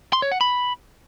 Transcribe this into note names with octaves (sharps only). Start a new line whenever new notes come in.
C6
C#5
F#5
B5